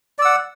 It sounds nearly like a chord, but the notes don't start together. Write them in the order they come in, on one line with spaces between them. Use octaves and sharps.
D5 E6 F#5